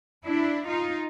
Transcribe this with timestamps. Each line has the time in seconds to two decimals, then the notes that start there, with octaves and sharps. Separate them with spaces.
0.25 D4 E4
0.68 D#4 F4